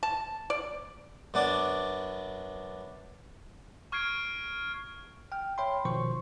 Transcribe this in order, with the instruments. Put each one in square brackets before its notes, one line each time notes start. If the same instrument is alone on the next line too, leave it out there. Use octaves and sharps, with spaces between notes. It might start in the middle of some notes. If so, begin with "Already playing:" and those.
[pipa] A5
D5
[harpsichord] F#2 B3 D4 D5
[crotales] C#6 F6 G#6 C7 D7
[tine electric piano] G5 F6
C#5 E5 G5 B5 C6
B2 D#3 F3 C5 C6 C#6